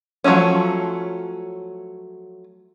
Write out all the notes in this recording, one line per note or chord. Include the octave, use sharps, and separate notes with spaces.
F3 F#3 G#3 A3 C#4